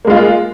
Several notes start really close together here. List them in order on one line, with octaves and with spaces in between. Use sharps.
A#3 G#3 F4